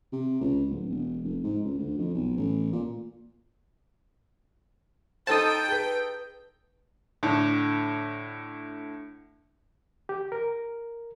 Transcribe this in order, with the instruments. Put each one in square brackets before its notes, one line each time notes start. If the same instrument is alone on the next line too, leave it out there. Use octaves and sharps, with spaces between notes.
[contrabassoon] C3
C#2
D1
E1
F1
G#2
C#2
D2
F2
B1
A1
A#2
[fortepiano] D#4 A4 C5 [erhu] G5 [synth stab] A5 D#6
[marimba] G#4 B4
[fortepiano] A2 D3
[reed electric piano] G4
A#4